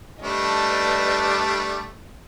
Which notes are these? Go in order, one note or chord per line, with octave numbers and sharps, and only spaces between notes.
G3 A3 D4 B4 D#5